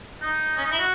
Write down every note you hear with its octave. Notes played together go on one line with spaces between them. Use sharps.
D#4
C#4
D#4
E4
F#4